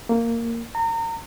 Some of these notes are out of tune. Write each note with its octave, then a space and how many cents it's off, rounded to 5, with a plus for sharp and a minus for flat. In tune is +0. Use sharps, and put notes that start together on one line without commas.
A#3 -10
A#5 -30